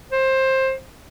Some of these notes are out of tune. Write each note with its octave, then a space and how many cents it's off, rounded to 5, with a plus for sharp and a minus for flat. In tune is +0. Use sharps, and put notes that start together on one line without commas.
C5 +20